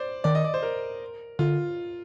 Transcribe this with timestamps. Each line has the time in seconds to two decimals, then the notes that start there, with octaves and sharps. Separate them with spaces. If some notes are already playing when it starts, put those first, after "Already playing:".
Already playing: C5 D5
0.24 D#3 D5
0.35 D#5
0.44 D5
0.54 C5
0.63 A#4
1.39 D3 F4